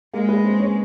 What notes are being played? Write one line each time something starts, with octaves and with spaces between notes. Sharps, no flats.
G#3 A#3 A#4
B3 B4
C4 C5
C#4 C#5